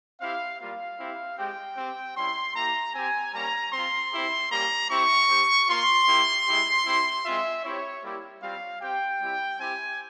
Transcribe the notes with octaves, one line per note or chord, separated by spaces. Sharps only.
C4 E4 G4 F5
G3 A#3 F4 F5
C4 E4 G4
G#3 C4 G4 G5
C4 G4
G3 C#4 E4 C6
A#3 E4 G4 A#5
C4 G4 G#5
G3 A#3 C#4 A#5
C4 F4 C6
C4 E4 G4
G3 A#3 C#4 G4 A#5
C4 E4 G4 C#6
C4 G4
A#3 F4 C6
A#3 E4 G4
G#3 E4 G4
C4 E4 G4
G#3 C4 F4 E5
C4 E4 G4 C#5
G3 A#3 E4 G4
G3 C4 F4 F5
C4 G4 G5
G3 C4 E4 G4
C4 E4 G4 G#5